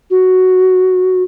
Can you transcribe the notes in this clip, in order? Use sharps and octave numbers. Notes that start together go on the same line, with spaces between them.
F#4